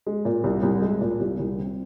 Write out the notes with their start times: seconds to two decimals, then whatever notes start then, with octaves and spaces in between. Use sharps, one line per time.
0.07 G#3
0.25 A#2
0.44 C2
0.63 C2
0.82 G#3
1.01 A#2
1.20 C2
1.39 C2
1.57 C4